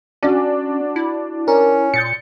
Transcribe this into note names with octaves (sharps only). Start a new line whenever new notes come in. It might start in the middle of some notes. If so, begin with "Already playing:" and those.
C#4 D4 F#4
E4
C#4 A#4
A#2 G6 A6 C#7